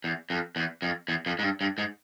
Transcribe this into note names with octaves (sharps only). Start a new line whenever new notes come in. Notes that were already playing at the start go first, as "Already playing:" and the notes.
E2
F2
E2
F2
E2
F2
G#2
G2
G2
G#2